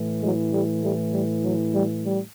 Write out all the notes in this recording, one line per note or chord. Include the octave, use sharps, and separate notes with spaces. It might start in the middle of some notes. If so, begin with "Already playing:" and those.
Already playing: A2 E3
F#3 G#3
G3 A3
G3 A3
G3
F#3
G3
G3